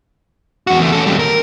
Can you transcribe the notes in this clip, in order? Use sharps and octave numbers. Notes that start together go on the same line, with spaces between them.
E2 F#4
E2 A3
C#4 A4
D#2 G3
A#4